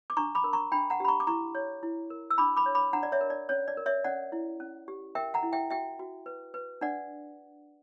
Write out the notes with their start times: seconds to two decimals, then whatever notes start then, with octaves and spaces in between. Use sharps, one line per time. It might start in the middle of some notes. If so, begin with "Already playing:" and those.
0.10 D6
0.17 D4 A#5 C#6
0.35 B5 D6
0.44 A#4
0.53 A#5 C#6
0.72 D4 G5 B5
0.90 F#5 A#5
1.00 G4 B5
1.08 A#5 C#6
1.20 D6
1.27 E4 A#5 C#6
1.55 C#5
1.83 E4
2.10 A#4
2.30 E6
2.38 D4 B5 D6
2.57 B5 D6
2.66 C#5
2.75 B5 D6
2.93 D4 F#5 A#5
3.03 D5
3.12 C#5 E5
3.21 A#4
3.30 D5
3.49 C#4 C#5
3.68 D5
3.77 A#4
3.86 C#5 E5
4.04 C#4 D5 F#5
4.32 E4
4.60 C#4
4.88 G4
5.15 A#4 E5 G5
5.34 F#5 A#5
5.43 E4
5.53 E5 G5
5.70 F#4 E5 G5
5.99 F#4
6.26 B4
6.54 B4
6.81 D4 D5 F#5